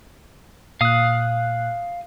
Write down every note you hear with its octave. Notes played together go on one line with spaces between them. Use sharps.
A#2 F5 D#6 F#6